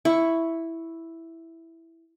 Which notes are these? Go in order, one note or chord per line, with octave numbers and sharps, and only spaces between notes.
E4 C#6